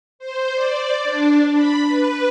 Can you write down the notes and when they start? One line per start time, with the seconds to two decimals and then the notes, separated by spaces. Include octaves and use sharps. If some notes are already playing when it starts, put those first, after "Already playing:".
0.19 C5
0.55 D5
1.04 D4
1.54 B5
1.87 B4